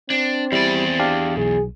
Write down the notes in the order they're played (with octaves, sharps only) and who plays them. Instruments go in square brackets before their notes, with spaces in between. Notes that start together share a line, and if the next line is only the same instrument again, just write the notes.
[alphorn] C4 [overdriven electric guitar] D4
[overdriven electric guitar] E2 D5 [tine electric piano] G3 E4
[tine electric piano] D4 G4 F5
[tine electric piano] B1 [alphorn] G#4